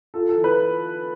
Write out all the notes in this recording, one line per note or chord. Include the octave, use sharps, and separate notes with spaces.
F4 A4
A4
E3
B4